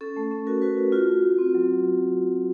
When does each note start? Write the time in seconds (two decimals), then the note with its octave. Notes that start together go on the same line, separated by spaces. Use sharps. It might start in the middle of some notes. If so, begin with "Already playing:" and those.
0.01 C#4 A4
0.16 A3
0.31 C#4
0.47 F#4 A#4
0.62 F#4 B4
0.77 F#4
0.92 F4 F#4
1.09 F4
1.23 F4
1.38 C4
1.55 F#3